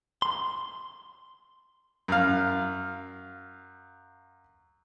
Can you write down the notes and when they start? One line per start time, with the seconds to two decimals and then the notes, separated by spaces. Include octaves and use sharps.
0.22 C6
2.08 F#2 F5